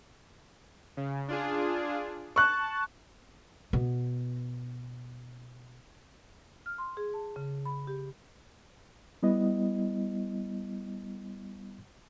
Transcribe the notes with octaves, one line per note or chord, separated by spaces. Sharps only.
C#3
D4 F4 G#4
A5 C#6 F#6
B2 B3
F6
C6
G#4
A5
C#3
B5
G4
G3 B3 E4 D#5